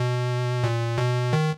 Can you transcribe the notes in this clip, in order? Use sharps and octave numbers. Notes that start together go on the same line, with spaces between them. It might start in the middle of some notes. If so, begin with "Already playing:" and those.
Already playing: B2
A#2
B2
D#3